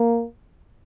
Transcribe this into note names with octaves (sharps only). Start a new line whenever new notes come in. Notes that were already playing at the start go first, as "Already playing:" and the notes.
Already playing: A#3